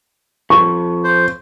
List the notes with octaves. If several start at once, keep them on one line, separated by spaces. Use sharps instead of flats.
F2 C#6
C5